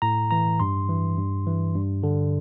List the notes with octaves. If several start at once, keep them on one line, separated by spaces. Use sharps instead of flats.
A2 A#5
E3 A#5
G2 C6
E3
G2
E3
G2
D3